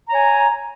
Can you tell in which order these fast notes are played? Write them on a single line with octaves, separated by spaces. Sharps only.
A#5 C#5 G#5